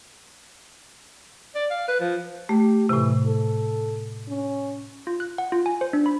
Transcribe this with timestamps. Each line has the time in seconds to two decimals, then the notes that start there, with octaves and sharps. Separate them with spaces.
1.55 D5
1.70 F5
1.88 B4
2.00 F3
2.49 A3 G4
2.89 A2 C3 E3
3.26 A4
4.28 C#4
5.07 F4
5.20 F#6
5.38 F#5
5.52 F4
5.66 G#5
5.81 C5
5.93 D4
6.06 B5